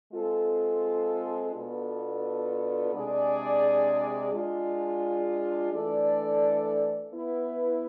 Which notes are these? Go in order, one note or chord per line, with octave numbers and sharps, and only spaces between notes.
G#3 C4 F4 A4
B2 B3 D4 F4 A4
C3 G#3 D4 G#4 D5
G#3 D4 F4
E3 A3 D4 A4 D5
B3 E4 B4